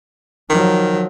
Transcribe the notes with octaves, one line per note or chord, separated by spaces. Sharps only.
D#3 F3 F#3